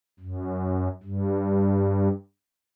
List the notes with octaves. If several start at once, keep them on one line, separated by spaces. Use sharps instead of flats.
F#2
G2